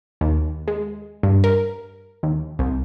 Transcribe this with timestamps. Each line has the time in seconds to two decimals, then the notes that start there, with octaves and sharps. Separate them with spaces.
0.21 D#2
0.68 G#3
1.23 G2
1.44 A#4
2.23 D#2
2.59 C2